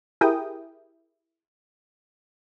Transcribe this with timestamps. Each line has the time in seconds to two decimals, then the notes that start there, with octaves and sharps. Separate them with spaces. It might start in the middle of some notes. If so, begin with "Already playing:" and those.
0.21 E4 G4 G#4 A#4 G5 D#6